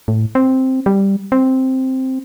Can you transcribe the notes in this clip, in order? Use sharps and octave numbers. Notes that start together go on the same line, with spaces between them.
A2
C4
G3
C4